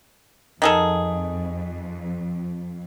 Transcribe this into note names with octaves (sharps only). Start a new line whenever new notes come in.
F2 D#3 G#4 A4